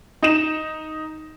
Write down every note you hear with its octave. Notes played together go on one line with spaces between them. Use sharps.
D#4 E7